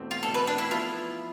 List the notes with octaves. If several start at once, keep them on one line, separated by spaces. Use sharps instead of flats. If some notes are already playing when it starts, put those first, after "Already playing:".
Already playing: E2 B2 A3 C4
F4
E2 B2 A3 C4 A4
B4
D4
E4
F3 B3 E4 F4